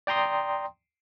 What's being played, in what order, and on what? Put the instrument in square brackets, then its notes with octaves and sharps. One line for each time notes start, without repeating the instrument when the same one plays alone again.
[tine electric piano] D5 G5 A#5 C6 D#6